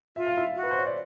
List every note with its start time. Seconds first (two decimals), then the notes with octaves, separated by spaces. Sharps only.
0.16 F4 E5
0.26 F5
0.37 E4 E5
0.56 F#4
0.63 B4
0.71 C5
0.79 C#5
0.86 D5